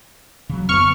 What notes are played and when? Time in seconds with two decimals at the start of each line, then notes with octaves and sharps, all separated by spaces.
0.49 C#3 F#3
0.69 F2 C#3 B3 C#6 F6